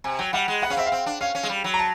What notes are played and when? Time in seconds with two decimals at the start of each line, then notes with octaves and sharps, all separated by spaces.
0.04 C3 G#5
0.19 F#3 G5
0.33 G3 F#5
0.48 G#3
0.62 B3 F#5
0.70 C#4 F5
0.77 C4 E5
0.87 F5
0.92 C4
1.06 D4
1.21 C#4 F5
1.35 C#4
1.43 G#3
1.49 G3
1.64 F#3
1.74 A#5
1.79 A5